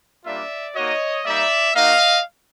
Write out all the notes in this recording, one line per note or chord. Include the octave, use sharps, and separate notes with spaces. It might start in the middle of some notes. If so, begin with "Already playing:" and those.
G3 A#3 D4 F4 D5 E5
A#3 D#4 F#4 C#5 D#5
G3 A#3 D#4 D5 E5
A#3 D#4 F#4 D#5 F5